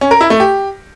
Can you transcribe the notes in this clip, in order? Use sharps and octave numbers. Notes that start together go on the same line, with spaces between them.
C#4
A#4
E4
A3
G4